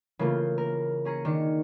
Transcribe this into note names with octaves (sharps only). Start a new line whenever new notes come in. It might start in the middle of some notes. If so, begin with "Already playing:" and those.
C#3 E3 A3 A#3 F4
A#4
C#4 G#4 A#5 C#7
D#3 D4 C#7